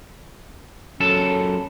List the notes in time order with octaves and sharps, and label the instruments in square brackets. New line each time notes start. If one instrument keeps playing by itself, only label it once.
[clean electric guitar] F#2 A4 A5 [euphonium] C#4